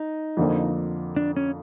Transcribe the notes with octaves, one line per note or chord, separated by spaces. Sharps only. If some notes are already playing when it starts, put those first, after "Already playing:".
Already playing: D#4
F2 D3 F3 A#3
D4
C#4